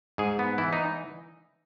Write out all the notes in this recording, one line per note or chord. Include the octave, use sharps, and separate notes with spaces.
G#2 G#4
B3
E3 E4
D#4